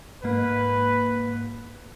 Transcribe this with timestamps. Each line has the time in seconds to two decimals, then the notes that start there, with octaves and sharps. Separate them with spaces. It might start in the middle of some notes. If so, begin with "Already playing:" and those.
0.24 G#2 A#3 B4